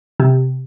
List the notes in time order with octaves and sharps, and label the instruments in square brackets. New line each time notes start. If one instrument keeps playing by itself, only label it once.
[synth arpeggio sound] C3